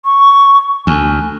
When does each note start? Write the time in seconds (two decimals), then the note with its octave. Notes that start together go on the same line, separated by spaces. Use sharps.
0.05 C#6
0.87 D2 G#5